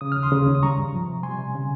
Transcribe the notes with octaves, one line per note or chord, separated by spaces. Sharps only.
C#3 D#6
F6
D#2
C6 D#6
C#3
D#2
D#6
G3 A#5 C#6
G2
F3
C3
G3 G#5 C6
C3
C#3